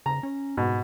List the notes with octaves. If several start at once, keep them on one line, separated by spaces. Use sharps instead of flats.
C#3 A#5
C#4
G#2 B2